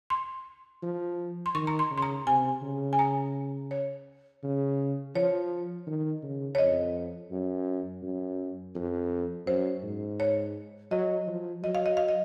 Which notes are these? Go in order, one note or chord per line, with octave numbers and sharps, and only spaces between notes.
C6
F3
C6
D#3 C#6
A#5
C6
C#3
C6
A#5
C3 G#5
C#3
G#5
A#5
C#5
C#3
F3 C#5
D#3
C#3
C#5
F2 D#5
F#2
F#2
F2
F#2 C5
G#2
C#5
F#3 D#5
F3
F#3 D#5
F5
D#5
F5
D#5